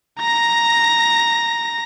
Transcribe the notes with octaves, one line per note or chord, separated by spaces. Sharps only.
A#5 A#6